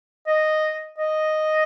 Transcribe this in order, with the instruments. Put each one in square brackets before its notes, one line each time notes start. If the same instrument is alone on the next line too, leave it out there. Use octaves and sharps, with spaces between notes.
[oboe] D#5
D#5